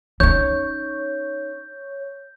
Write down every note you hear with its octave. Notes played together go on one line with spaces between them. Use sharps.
C#4 D#4 C#5 G6